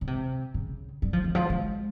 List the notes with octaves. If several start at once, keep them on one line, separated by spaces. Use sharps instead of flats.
C#3
C3
C#3
G3
F3
D#3
F3
G#3